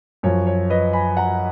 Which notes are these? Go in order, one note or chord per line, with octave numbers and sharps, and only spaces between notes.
F#2 F3 C#5
C#5
B4 D#5
G#5 B5
F#5 A#5